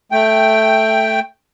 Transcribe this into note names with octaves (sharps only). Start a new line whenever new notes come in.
A3 G5